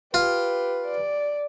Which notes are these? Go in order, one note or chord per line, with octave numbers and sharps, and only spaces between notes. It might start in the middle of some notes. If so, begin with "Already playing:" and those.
F4 G4 B4
D5